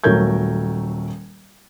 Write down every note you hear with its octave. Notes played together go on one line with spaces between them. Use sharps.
D#1 F#3 A3 A#4 G6 G#6